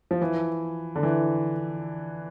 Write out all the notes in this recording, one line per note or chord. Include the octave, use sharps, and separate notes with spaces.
F3
E3
D3
E3